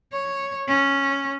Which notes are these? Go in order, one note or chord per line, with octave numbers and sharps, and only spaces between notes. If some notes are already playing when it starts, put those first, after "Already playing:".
C#5
C#4